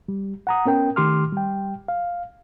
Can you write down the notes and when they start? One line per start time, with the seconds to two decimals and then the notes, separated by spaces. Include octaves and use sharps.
0.08 G3
0.47 F#5 A#5 D#6
0.65 B3 C#4 A#4 G5
0.96 D#3 A3 G4 C6 D6 F6
1.32 G3 G5
1.88 F5